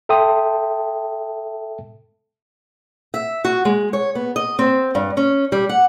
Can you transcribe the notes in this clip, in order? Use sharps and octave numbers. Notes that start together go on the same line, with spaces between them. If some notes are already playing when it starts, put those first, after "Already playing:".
A4 E5 G5 A5 C6 D#6
E5
F#4
G#3
C#5
B3
D#5
C4
G2
C#4
G3
F#5